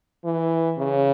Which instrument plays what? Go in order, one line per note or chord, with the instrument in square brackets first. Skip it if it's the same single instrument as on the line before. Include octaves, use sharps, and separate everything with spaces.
[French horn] E3
C#3